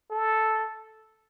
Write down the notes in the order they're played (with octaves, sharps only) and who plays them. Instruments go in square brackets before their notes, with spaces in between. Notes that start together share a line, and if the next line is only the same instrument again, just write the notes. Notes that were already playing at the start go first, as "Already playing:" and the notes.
[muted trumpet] A4